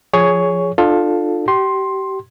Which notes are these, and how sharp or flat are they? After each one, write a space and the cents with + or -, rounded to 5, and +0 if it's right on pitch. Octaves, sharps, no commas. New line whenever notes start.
F3 +0 G#4 +0 C#5 +10
D4 +40 F4 +15 A4 +0
G4 -30 C6 +10